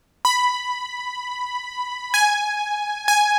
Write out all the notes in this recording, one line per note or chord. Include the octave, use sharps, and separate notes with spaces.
B5
G#5
G#5